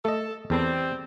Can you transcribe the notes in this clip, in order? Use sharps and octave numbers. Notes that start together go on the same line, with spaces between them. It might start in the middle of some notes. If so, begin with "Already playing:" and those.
A3 A4 D#5
E2 G3 C4 A4 B4